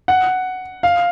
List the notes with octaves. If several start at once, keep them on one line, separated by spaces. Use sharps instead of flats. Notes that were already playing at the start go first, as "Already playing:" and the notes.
F#5
F5